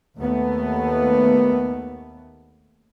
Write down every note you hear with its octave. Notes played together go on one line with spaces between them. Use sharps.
D#2 A3 B3